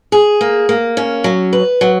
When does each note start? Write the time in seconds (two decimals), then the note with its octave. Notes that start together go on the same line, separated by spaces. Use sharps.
0.12 G#4
0.41 A#3
0.69 A#3
0.97 C#4
1.24 F#3
1.53 B4
1.81 F#3